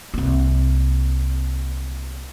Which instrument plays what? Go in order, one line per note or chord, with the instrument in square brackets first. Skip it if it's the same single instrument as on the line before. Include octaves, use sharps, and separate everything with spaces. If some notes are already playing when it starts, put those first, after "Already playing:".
[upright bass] C2 A#3